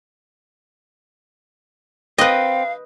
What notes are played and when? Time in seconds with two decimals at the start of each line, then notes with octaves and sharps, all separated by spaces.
2.18 C4 B4 D#5 F5